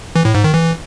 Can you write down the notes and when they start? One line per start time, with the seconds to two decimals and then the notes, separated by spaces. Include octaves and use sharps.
0.16 E3
0.25 A2
0.35 G#2
0.44 D#3
0.54 E3